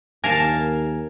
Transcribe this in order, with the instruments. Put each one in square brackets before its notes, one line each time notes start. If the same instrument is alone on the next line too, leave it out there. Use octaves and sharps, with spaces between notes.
[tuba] D#2 [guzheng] A#4 F5 A5 [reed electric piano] G#5